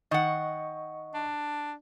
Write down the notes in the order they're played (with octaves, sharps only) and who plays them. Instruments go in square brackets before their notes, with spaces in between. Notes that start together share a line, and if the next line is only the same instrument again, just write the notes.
[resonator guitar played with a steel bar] D#3 F#5 [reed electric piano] D#5 C#6
[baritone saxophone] D4